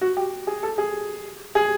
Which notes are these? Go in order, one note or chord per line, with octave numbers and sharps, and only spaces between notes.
F#4
G4
G#4
A4
G#4
G#4